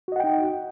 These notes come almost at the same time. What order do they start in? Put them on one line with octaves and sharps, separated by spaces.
F#4 D#5 F#5 G5 D#4